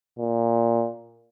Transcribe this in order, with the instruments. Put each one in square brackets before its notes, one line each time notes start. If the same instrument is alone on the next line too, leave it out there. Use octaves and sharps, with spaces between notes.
[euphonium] A#2